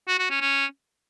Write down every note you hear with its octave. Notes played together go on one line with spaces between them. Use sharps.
F#4
F#4
C#4
C#4